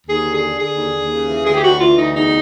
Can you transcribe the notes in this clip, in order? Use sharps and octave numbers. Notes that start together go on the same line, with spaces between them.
D#2 G#4
D3
G#4
D3
D3 G#4
D#2
D#2
C#3
E3
D2 G#4
G4
D2 F#4
E3 F4
D2 D#4
E2 D#4